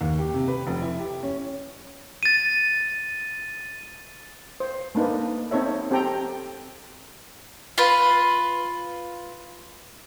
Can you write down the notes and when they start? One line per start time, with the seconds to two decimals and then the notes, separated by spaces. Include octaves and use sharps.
0.01 D#2
0.19 G4
0.34 C3
0.48 B4
0.67 F1
0.82 E4
0.99 G4
1.23 C#4
2.23 A6 D#7
4.60 C5
4.95 A3 A#3 D4 D#4 B4
5.51 C4 D#4 A4 C#5 E5
5.91 C4 G4 A4 G5 A#5
7.78 F4 B4